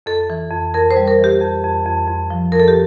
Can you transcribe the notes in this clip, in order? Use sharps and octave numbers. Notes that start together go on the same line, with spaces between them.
F2 A4
E3
F2
F2 A#4
C5
G3
A#4
E3
G4
F2
F2
F2
F2
F3
F2 A#4
A4
G4